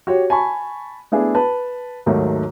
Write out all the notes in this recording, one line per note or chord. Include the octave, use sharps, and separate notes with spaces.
F#4 G4 C#5
G#5 A5 B5 C#6
A3 B3 D4 E4 G#4
B4 A5
D#2 G#2 D#3 F#3 A3